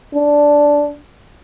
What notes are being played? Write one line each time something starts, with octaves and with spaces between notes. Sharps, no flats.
D4